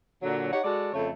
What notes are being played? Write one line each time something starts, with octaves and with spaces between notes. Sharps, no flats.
A#2 D3 F#3
D#4 G4 C#5 F#5
G#3 F#4 A4 D5
F2 C#3 A3 C#5